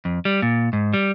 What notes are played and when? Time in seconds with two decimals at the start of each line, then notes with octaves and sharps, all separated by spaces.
0.05 F2
0.25 G3
0.42 A#2
0.73 G#2
0.94 G3